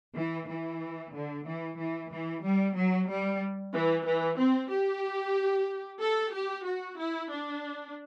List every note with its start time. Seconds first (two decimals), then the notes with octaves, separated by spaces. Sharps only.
0.16 E3
0.48 E3
1.13 D3
1.46 E3
1.78 E3
2.11 E3
2.43 G3
2.76 F#3
3.09 G3
3.73 E3
4.06 E3
4.38 C4
4.71 G4
6.01 A4
6.34 G4
6.66 F#4
6.98 E4
7.31 D4